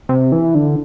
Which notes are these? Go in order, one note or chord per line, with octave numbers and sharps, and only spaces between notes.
C3
E3
D3